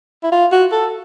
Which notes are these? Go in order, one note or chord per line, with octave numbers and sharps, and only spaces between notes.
E4
F4
F#4
A4